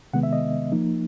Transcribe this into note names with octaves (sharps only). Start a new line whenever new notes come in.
C3 D#3 G#3 B3 F#5
E5
D#5
F3 A#3 D#4